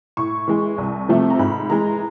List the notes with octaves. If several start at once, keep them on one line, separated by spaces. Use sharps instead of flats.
A2 C#6
E3 G#3
C2
C3 F3 A3
A#5
G#2 B5
E3 G#3 A#5